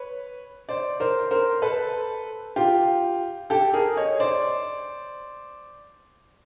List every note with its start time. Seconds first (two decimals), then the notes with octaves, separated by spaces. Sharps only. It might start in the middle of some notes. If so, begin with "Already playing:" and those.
Already playing: B4 C#5
0.69 C5 D5
1.00 A#4 C5
1.31 A#4 C5
1.62 A4 B4
2.56 F4 G4
3.50 G4 A4
3.73 G#4 A#4
3.97 C#5 D#5
4.20 C5 D5